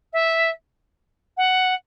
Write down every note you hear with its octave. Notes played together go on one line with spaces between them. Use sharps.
E5
F#5